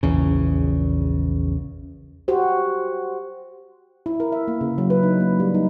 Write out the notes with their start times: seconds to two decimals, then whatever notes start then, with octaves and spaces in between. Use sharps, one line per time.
0.03 A#1 E2 C#3
2.28 F#4 G4 C5
4.06 E4
4.20 A#4
4.32 E5
4.48 A#3
4.61 C#3
4.78 F#3
4.90 B4
5.03 D#4
5.20 A#3
5.40 G3
5.54 D#4